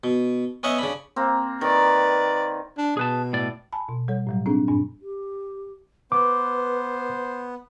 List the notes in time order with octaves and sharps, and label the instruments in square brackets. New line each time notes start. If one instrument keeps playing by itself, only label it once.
[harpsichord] B2
B3 C#4 D#5 E5 F#5
C#3 D4 B5
[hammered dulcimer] A#3 C4
[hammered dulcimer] D#3 [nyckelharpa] B4 D5
[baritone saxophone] D4
[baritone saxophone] B2 [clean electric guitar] G#4 B4 A5
[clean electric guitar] A2 D5
[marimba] G#5 A5 B5
B2
G3 A4 C#5
A2 F#3 G3
C4 D4 D#4 G#4 A4
G2 A#2 D4
[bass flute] G4
[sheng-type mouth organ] B3 [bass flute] B4 [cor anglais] C5 [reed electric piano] D6